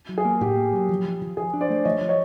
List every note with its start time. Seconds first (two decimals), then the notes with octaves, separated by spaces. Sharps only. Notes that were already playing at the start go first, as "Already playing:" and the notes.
0.09 F#3
0.18 G#4
0.25 A#3
0.41 A2 G4
0.57 A#3
0.73 F#3
0.89 F3
1.05 F3
1.21 F3
1.37 F3 G#4
1.53 D4
1.61 C5 D5
1.70 A3
1.85 F3 C#5 D#5
2.01 F3
2.09 C#5 D#5